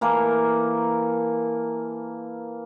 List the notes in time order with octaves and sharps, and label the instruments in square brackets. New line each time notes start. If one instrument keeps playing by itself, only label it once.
[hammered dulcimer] E3 A#3 A4 A#4